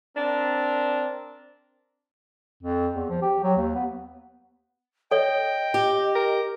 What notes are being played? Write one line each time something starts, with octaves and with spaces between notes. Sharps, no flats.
C4 D4 A#4
F2
E2
F3
G4
F#3
D#2
B3
A4 C#5 D#5 G5
G4
A#4